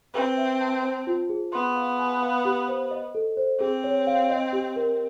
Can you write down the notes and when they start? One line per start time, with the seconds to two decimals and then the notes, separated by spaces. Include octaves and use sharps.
0.14 C4 B4
0.37 E5
0.60 A5
0.83 C5
1.07 F4
1.29 G#4
1.53 B3 C6
1.76 F5
1.99 G#5
2.22 F5
2.45 G4
2.68 C5
2.91 D#5
3.15 A4
3.37 C5
3.60 C4 G#4
3.84 C#5
4.07 F5
4.30 D#5
4.53 G4
4.76 A#4